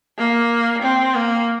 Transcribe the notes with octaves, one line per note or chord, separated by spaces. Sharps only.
A#3
C4
A#3